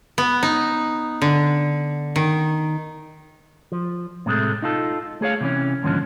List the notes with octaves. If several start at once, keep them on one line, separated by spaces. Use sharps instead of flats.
B3
D#4
D3
D#3
F3
A2 C3 G#3 A3
D#4 F4 A4
A3 G#4 C#5 F5
C3 E3 C#4
D#2 G#2 D3 F3 C#4